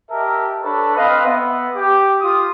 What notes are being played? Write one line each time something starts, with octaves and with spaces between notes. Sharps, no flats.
G4 A#4 D#5 E5 A5
D4 A4 B4 C#5 B5
C4 B4 D#5 F5
B3 E5
G4 D6
F4 D#6